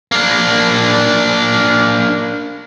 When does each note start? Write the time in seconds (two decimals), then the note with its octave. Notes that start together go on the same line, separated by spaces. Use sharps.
0.12 A#3 D4